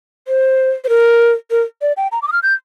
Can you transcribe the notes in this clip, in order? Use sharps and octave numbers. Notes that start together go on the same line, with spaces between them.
C5
C5
A#4
A#4
D5
G5
A#5
D6
D#6
F6
G6